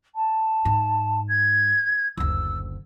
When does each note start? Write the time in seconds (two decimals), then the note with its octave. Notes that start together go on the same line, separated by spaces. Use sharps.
0.15 A5
0.65 G#2
1.28 G#6
2.17 F#1 D2 E6